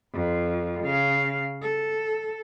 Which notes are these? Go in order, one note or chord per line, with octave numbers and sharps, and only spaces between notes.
F2
C#3 F5
A4